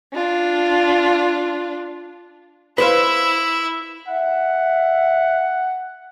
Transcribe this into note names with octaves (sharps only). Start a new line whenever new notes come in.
D4 F4
E4 B4 C5 E5 F5
E5 F#5